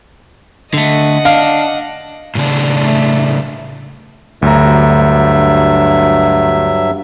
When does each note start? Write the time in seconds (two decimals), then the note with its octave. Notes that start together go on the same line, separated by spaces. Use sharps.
0.74 D3 A3 D#5 F#5
1.25 D4 F5
2.35 A2 C#3 D4
2.80 A3
4.42 D2 G2 F#3 E5 A#5